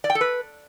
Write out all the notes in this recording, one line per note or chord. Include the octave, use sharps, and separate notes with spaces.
D5
G5
A4
B4